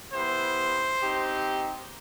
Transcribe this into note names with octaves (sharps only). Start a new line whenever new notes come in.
B3 E4 G4 C5
C4 D#4 G4